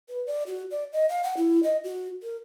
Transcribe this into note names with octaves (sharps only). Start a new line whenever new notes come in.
B4
D5
F#4
D5
D#5
F5
F#5
E4
D#5
F#4
A#4